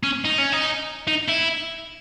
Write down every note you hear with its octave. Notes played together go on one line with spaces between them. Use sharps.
C#4
D#4
C#4
D#4
D#4
E4